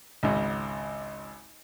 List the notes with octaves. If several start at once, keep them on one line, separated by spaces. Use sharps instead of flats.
G#1 C#2